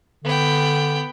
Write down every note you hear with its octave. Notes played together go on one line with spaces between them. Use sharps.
D3 B3 G5